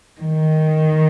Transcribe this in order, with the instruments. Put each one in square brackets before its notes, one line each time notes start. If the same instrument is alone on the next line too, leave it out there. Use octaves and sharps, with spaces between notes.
[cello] D#3